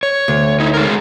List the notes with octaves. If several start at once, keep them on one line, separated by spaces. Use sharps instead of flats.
C#5
D2
D#4 E4
G#3 A#4